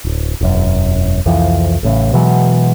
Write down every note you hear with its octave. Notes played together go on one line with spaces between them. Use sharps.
D1
E1 F#2
C2 F2 E3 F3
A1 A2 C#3
B2 E3 F#3 G#3